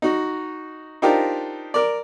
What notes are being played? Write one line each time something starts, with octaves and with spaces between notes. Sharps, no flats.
D#4 F#4
D4 D#4 F4 G4 A#4 C5
A#4 D5